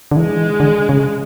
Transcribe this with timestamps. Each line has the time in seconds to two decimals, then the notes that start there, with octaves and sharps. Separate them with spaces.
0.11 D3
0.16 E3 G#3
0.60 D3
0.89 C#3